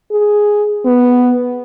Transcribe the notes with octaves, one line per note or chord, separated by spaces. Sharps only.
G#4
B3